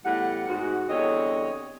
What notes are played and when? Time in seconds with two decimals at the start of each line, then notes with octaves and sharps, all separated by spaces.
0.04 E2 A2 G3 F#5
0.48 G#2 F#4
0.88 E2 G2 D3 C4 C#5 D#5